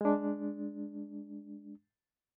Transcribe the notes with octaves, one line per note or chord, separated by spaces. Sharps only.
G#3 D4